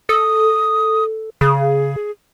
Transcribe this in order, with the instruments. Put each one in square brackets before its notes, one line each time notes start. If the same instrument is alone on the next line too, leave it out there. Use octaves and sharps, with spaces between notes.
[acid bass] A4 [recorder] D#6
[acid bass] C#3 [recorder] G#4